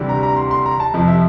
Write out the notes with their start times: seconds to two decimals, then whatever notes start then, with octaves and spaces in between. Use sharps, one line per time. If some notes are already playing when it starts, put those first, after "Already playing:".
Already playing: D2 C3 E3 G3 D4
0.09 A#5
0.23 A#5
0.36 C6
0.51 C6
0.66 A#5
0.80 A5
0.94 F2 C3 F3
1.08 E5